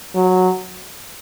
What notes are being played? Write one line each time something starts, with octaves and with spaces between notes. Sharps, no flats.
F#3